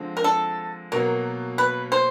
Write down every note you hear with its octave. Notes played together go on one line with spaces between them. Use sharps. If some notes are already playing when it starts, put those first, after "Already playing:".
Already playing: D3 F3 G#3 C4
A#4
A4
B2 F#3 A#3 A#4
B4
C5